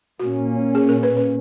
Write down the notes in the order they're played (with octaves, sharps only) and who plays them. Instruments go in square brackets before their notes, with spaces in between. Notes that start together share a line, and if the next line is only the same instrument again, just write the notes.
[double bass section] A#2 A#3 C#4 [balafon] F#4
[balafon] G#4
A#4
B4
B4